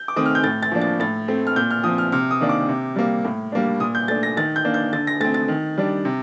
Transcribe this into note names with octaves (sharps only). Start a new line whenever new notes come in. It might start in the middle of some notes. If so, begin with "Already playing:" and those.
Already playing: G6
D6
D#3 A3 C4 D#6
F6
G6
A2 A6
A6
F3 A#3 D4
A6
A2 A6
A3 C4
F6
A#2 G6
F6
F3 C4 D#6
F6
C3 F6
D#6
D#3 A#3 D4
D6
C3
G3 A#3
A2
G3 A#3 D4
A#2 D#6
G6
A3 D4 A6
A#6
D#3 A6
G6
A#3 D4
G6
D3 A6
A#6
A3 C4 A6
A6
D#3
G3 D4
C3